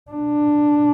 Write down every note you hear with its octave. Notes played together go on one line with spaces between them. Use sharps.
D4